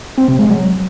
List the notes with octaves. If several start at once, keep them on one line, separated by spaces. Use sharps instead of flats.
C4
C3
G#3
F#3